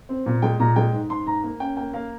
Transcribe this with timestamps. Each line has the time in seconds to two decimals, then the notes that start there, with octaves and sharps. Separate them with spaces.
0.09 C4
0.26 A#2
0.42 G#3 G5
0.60 A#2 A#5
0.76 G#3 G5
0.93 G#2
1.10 G#2 C6
1.26 G#2 A#5
1.43 A#3
1.60 C#4 G5
1.77 A#3 G5
1.93 A#3 F5